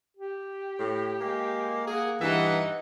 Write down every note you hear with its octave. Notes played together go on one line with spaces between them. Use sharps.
G4
A2
G#3 A#3
A#3 G#4 F#5
G2 E3 D#4 E5 F#5